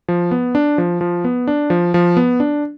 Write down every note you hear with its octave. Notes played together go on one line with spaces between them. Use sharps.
F3
B3
D4
F3
F3
B3
D4
F3
F3
B3
D4